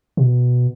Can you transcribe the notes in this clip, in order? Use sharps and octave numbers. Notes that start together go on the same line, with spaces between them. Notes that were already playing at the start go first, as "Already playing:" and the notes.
B2